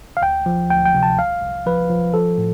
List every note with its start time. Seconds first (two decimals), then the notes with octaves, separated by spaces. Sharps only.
0.17 F5
0.22 D2 G5
0.46 F3
0.70 D2 G5
0.86 G5
0.95 C3
1.03 A5
1.18 C2 F5
1.41 C2
1.66 F3 B4
1.89 F3
2.14 F3 A4
2.38 A2